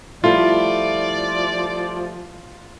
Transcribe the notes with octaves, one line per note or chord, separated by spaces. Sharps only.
F3 G3 A3 E4 F4 D5